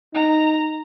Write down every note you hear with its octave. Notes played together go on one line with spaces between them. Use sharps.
D#4 A#5